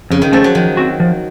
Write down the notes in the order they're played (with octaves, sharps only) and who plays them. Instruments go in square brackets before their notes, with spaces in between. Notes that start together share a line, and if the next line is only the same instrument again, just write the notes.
[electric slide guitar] F2 [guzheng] C#3
[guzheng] D#3
[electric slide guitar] C#3 A3 C#4 A4 [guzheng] F3
[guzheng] F#3
[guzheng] D#3 [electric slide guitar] F3
[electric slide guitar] C4 F#4
F3